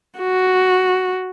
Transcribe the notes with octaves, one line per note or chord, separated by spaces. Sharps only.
F#4